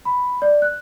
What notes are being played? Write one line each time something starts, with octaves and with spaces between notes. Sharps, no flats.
B5
D5
F#6